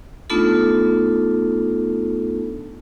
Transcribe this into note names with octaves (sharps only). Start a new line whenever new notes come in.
A3 B3 D4 D#4 F4 A4